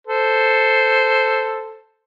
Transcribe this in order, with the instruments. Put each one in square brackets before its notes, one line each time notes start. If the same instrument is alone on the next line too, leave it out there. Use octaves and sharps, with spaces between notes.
[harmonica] A4 C5